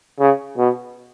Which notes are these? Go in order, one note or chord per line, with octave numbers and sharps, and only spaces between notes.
C#3
B2